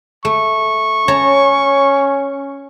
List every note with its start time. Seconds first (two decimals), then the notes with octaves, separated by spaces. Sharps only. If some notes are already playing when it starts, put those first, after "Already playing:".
0.25 A3 C#6
1.08 C#4 C#5 A5 A#5